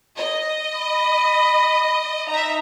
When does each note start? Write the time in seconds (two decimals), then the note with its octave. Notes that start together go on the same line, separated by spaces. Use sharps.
0.16 D#5
0.74 B5
2.29 D#4 E5 A#5